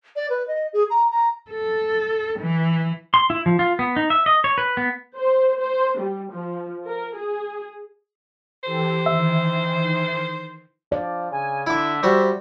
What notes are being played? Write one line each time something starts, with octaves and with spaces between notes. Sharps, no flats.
D5
B4
D#5
G#4
A#5
A#5
A4
E3
C6
E4
F3
F4
B3
D#4
E5
D#5
C#5
B4
B3
C5
C5
G3
F3
A#4
G#4
E3 G4 A4 C5
D#3 E3 E5
F3 D5
C#3 G#5
D3 E4 E5 D6
G3 F#4 C5